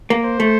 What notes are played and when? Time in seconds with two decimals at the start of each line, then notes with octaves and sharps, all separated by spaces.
0.10 A#3
0.25 C5
0.40 A3